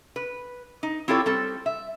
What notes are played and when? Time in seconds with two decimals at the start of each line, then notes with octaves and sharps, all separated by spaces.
0.16 B4
0.83 D#4
1.08 C4 E4 F4 G4 A4 C#5
1.26 G3 C4 A4
1.66 E5